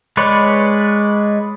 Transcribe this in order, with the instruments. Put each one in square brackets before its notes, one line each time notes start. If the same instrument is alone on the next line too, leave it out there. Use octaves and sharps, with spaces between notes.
[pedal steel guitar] G#3 B4 C#5 D5